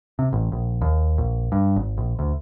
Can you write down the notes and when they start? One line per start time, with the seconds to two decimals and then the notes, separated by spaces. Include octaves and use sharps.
0.19 C3
0.33 A1
0.52 A#1
0.81 D#2
1.18 A#1
1.52 G2
1.76 G#1
1.98 A#1
2.19 D2